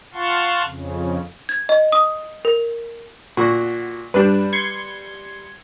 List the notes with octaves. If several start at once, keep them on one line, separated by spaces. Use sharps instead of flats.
F4 F5 F#5 A5 C6 C#6
F2 C#3
G#6
D#5
D#6
A#4
A#2 F#4
G2 G3 D4 B4
C6 G#6 C#7